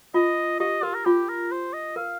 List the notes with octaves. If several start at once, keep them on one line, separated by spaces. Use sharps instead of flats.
F4 D#5
G4 D#5
F4 A#4
A#4
F4 G4
A#4
C5
D#5
A#4 F5